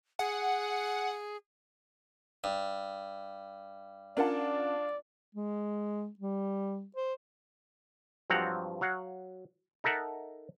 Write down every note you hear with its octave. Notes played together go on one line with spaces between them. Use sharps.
G#4 F#5
G2
C#4 D4 F4 A#4 D5 F#5 A5
G#3
G3
C5
G2 F3 F#3 C4 F#5 A#5
F#3 F5 F#5
D#4 A4 A#4 E5 F#5